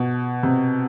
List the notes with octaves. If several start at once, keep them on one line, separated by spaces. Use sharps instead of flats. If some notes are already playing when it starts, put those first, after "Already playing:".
Already playing: B2
C3